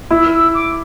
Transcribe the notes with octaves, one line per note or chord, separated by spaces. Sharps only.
E4 E6
E6
D6